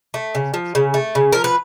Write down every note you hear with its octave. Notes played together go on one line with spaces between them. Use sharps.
A3
C#3
F3
C#3
A3
C#3
F3 A#4
B4